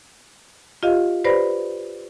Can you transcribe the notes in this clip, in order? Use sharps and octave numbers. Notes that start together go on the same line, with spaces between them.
F4 G4 D#5 F5
G4 B4 C5 D5 B5 A#6